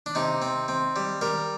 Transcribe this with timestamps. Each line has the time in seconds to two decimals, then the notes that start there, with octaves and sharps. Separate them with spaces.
0.06 D4
0.15 C3 D#4
0.42 C4
0.68 C4
0.96 G3
1.21 G3 A#4